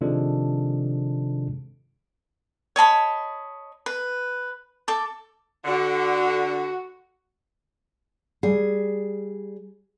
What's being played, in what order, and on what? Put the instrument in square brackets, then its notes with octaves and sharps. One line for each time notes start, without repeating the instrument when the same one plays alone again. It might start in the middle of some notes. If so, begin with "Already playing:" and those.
[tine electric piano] C3 D#3 F3 G#3 D4 A4
[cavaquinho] C#5 D#5 A5 B5
B4
A4 D6
[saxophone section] D3 [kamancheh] F#4
[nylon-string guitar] G3 G#4